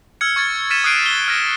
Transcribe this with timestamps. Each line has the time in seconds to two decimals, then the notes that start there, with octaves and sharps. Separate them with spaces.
0.21 E6 F6 G#6 C#7
0.36 C#6 G#6 A6
0.70 F6 A6 B6 C#7 D#7 E7
0.84 D#6 F6 F#6 C7 D7 D#7
1.06 G7
1.28 F6 A#6 D#7